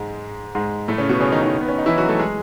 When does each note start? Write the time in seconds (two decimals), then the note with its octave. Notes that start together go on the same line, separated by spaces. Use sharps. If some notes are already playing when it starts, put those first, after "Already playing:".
Already playing: G#2 G#3
0.55 G#2 G#3
0.88 A2 A3
0.98 C#3 C#4
1.09 B2 B3
1.20 C#3 C#4
1.32 D#3 D#4
1.42 D#3 D#4
1.61 B3
1.69 C#4
1.78 D#4
1.86 E3 E4
1.98 F#3 F#4
2.09 A3 A4
2.19 G#3 G#4